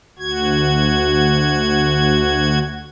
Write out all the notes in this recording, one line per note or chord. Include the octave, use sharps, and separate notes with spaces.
D2 F#4 G#6